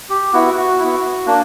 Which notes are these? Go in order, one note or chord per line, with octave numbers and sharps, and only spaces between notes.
G4
B3 E4 F#4
F#4
B3 E4
A#3 D4